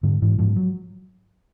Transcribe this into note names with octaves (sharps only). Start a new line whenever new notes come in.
G#2 D3
G#2 E3
G#2 F3
F#3